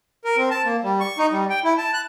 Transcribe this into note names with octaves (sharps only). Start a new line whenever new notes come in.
A#4
C4
A5
A#3
G3
C#6
D#4
G3
G5
E4
A5
F#6